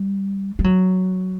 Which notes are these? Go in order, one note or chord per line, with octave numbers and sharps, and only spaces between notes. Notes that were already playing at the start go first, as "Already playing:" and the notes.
Already playing: G3
G3
F#3